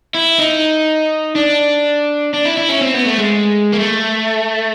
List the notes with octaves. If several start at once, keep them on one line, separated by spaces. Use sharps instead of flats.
E4
D#4
D4
D4
E4
E4
C#4
C4
B3
A3
G#3
A#3
A3